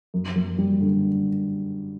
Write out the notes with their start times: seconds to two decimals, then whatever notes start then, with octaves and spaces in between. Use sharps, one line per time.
0.14 F#2
0.36 F#2
0.58 G3
0.80 D3